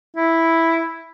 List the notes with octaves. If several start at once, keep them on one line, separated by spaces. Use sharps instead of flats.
E4